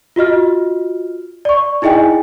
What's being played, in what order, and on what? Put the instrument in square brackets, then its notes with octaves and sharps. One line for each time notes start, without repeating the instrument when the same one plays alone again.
[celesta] F4 F#4 D#5 F6
D5 C#6
D#4 E4 G#4 D#5 G5 G#5